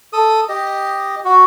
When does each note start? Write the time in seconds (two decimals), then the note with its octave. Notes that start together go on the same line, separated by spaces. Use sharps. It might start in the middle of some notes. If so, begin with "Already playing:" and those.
0.13 A4 D#6
0.49 G4 D#5
1.25 F#4